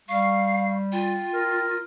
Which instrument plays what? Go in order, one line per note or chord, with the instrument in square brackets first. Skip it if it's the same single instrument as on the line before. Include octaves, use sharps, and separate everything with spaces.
[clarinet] G3 [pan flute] F5 [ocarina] C#6
[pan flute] F4 [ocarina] G5
[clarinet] A#4